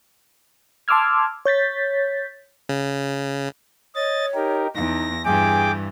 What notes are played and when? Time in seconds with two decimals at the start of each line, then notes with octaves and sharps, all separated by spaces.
0.88 A5 C6 D6 E6 F6 G#6
1.46 C#5 G6 A6 B6
2.69 C#3
3.96 C#5 D#5 A6
4.34 D#4 G4 A#4
4.75 E2 D#4 A#6
5.25 G2 E3 G#4 G5 G#5 D6